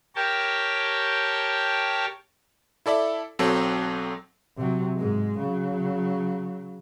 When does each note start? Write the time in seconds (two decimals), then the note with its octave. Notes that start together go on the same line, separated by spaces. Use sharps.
0.16 G4 A#4 C#5 G5 A5
2.86 E4 A4 D5 E5
3.39 B1 F#3 C4 A4
4.57 C3 F#3
4.95 G#2 G#3
5.39 C#3 F#3